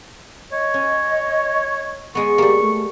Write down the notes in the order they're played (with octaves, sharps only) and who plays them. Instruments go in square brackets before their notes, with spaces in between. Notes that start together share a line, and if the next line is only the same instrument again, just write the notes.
[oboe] C#5 [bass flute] D#5
[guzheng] C#4
[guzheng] G#3 B3 [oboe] C#6
[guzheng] G3 A#3 [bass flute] G4
[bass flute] A3